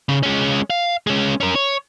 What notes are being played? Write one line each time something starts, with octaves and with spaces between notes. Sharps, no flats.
C#3
G#3 C#4
F5
G#3 C#4
C#4 A#4
C#5